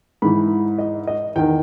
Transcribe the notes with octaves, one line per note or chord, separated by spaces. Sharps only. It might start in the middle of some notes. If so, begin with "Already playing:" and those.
G#2 E3 B5
D#5
D#5
E2 D#3 G5